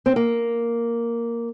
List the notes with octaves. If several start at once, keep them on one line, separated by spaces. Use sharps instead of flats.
C4
A#3